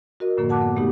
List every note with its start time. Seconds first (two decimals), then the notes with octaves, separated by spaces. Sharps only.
0.20 F#4 A#4 D#5
0.37 F#2 A2 D3 F3 A#3
0.49 F#5 A5 D6 F#6
0.62 B3
0.76 G#2 B2 A3 B3 D#4 G4